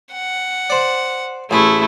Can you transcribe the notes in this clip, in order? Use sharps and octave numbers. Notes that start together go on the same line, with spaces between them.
F#5
C5 D5
A1 A3 E4 G#4